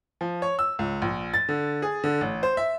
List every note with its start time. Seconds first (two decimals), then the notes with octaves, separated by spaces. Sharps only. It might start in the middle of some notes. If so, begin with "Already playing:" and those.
0.21 F3
0.42 C#5
0.59 E6
0.79 C#2
1.02 A#1
1.34 A6
1.49 D3
1.82 G#4
2.04 D3
2.21 A1
2.43 C5
2.57 E5